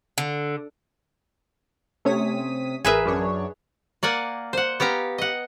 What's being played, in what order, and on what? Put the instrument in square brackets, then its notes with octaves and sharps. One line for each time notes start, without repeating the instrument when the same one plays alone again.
[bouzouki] D3
[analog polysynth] C3 D#6 B6 [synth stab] A3 C#4 C#5
[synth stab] A1 A#4 [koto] G#4 B4 E5
[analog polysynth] F#2 D4 C#5
[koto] A#3 D5 F#5 G#5
C5 F#5
B3 G4 F5 A#5
D#5 F#5